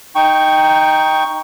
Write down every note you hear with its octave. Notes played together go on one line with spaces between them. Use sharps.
D#4 G5 C#6